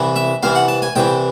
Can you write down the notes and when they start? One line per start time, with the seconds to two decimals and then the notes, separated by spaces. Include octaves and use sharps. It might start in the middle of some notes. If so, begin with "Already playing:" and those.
Already playing: C2 C3 E3
0.16 E5
0.43 C2 C3 E3 F5
0.55 F#5
0.68 A5
0.82 G#5
0.96 C2 C3 E3 G5